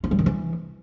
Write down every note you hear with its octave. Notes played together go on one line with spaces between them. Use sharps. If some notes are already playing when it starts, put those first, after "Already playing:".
F4
G3
D#3
E3